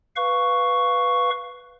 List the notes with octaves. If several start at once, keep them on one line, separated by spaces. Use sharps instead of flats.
B4 F5 C#6